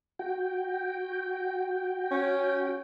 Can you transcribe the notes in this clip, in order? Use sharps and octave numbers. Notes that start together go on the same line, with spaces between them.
F#4 G5
C#4